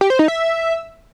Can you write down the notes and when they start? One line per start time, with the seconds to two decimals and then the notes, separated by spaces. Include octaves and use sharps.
0.01 G4
0.10 C5
0.19 D#4
0.28 E5